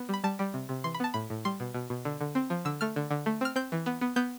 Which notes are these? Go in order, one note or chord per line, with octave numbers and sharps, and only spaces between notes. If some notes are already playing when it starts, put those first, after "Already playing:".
Already playing: B3
G3 B5
G3 A5
G3
C3
C3
E3 C6
B5
B3 A5
A2 B5
A2
G3 C6
B2
B2
B2
D3
D3
C4
F3
D3 E6
A3 F6
D3
D3
A3
C4 F6
C4 G6
E3
B3
B3
B3 G6